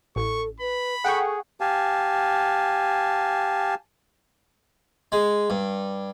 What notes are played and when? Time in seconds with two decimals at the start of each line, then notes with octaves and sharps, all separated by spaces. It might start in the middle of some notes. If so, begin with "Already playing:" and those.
0.16 A1 A4 C#6
0.60 B4 B5
1.04 G#4 A4 F#5 G5 C#6
1.60 G4 F5 G#5 A5
5.12 G#3
5.50 G2